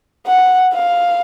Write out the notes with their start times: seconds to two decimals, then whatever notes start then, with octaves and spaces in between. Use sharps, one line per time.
0.27 F#5
0.73 F5